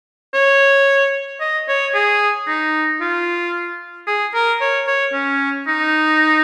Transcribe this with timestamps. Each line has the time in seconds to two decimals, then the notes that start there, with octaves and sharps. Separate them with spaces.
0.34 C#5
1.41 D#5
1.68 C#5
1.94 G#4
2.47 D#4
3.01 F4
4.07 G#4
4.34 A#4
4.61 C#5
4.87 C#5
5.13 C#4
5.67 D#4